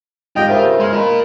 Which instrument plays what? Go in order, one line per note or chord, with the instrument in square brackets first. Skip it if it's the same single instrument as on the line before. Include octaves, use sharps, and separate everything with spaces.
[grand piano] G#1 G4 G6 [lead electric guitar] F4 [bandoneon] D#5 G5
[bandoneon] G2 C#3 [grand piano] A#4 C5 E5
[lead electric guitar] G#3 [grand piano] C6 F6
[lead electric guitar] F4 A#4 [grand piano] D#5 B5